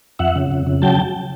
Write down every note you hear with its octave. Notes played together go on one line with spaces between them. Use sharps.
F2 E5 F#5
C#3
F2
C#3
F#3 G5 A5